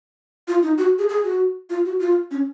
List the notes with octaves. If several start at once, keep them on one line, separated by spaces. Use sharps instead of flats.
F4
D#4
F#4
G#4
G#4
F#4
F4
F#4
F4
C#4